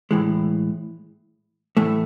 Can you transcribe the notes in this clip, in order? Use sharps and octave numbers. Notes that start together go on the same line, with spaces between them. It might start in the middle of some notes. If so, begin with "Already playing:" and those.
A2 E3 G#3
A2 E3 A3